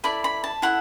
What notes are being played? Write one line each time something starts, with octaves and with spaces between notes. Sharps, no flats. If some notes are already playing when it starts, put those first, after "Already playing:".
E4 A4 D5 B5
B5
A5
E4 A4 F#5